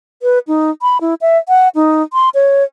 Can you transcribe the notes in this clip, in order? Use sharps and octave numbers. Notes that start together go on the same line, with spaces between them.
B4
D#4
B5
E4
E5
F#5
D#4
C6
C#5